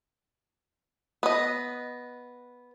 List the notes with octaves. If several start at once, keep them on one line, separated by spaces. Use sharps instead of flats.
B3 D#5